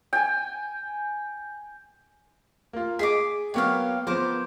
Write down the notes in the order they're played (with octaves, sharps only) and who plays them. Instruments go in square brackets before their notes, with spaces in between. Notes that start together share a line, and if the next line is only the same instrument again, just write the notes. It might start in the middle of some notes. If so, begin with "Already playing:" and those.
[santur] G5 G#5
[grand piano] A#3 F4
[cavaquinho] G#4 D#5 D6 [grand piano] B6
[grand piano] F#3 A#3 B3 [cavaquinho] G4 C#5 F5
[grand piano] F3 B3 [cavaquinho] A#4 C5 D6